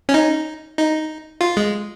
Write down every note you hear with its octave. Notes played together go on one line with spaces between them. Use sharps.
C#4
D#4
D#4
F4
G#3